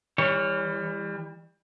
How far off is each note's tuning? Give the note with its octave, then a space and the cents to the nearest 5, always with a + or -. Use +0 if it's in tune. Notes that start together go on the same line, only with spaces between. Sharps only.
E3 -10 G3 +30 C#5 +0